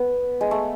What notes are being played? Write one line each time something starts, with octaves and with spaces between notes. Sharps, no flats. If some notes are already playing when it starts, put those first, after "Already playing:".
Already playing: B3
G#3
A3